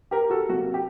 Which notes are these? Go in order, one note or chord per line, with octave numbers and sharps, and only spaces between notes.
G4 A#4
F#4 A4
C3 F#3 A#3 F#4
G4